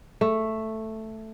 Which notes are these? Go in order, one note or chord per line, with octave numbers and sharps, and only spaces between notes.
A3